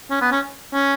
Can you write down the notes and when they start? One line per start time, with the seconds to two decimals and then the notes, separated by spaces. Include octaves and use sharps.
0.10 C#4
0.21 B3
0.31 C#4
0.73 C#4